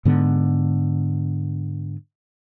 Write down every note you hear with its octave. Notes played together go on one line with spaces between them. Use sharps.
G#2 D3 B3